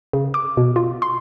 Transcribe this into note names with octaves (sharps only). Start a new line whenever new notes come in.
C#3
D6
B2
F4
C6